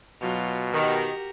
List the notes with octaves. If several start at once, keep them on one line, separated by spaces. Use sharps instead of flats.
B2 F#3 F4
D#3 F#4 G4 A#4